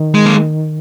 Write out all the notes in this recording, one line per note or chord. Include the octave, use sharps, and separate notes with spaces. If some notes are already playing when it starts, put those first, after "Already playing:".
Already playing: D#3
G#3
A#3